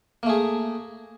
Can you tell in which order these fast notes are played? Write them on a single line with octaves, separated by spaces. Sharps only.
A#3 A3 G#4